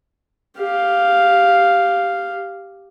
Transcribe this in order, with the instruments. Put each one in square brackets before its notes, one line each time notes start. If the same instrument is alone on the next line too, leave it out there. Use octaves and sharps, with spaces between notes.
[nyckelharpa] G4 F5